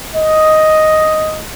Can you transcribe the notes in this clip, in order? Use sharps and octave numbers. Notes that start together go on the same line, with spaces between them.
D#5